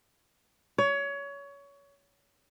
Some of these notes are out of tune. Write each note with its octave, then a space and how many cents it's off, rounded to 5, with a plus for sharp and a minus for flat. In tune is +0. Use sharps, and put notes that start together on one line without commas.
C#5 +25